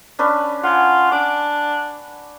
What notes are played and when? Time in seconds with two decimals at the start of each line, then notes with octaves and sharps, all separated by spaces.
0.19 C#4 D4 B4
0.63 F4 F#5 G#5
1.12 D4 D6